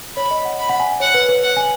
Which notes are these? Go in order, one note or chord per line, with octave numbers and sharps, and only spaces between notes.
C#5 B5
D#5
F#5
B5
F#5
G#5
F#5
C#5 F#5
B4
B4
F#5
G#5